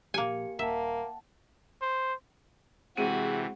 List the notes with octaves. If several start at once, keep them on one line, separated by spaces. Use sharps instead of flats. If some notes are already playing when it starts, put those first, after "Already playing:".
A#2 F3 A#3 G4 G#5 C#7
D#1 A#3 E5 F#5 G5 A5
C5
C3 E3 G#3 C4 F#4 G#4 D#7